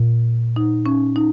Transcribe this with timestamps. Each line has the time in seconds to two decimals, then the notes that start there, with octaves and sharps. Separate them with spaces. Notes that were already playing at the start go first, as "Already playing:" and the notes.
Already playing: A#2
0.56 D#4
0.86 C#4
1.16 D#4